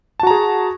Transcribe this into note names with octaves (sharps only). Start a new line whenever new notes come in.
F#4 G#4 A5 A#5